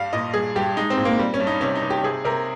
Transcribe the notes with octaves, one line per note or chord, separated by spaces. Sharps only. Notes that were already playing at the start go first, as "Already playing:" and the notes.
Already playing: G2 G3 F5
A#2 D#5
G2 G#4
G2 G4
G#3 D#4
C4
A#2
A#3
G3
C#4
G2
D#4
C3 C#4
D#4
C3
G4
C3 G#4
C3 A#4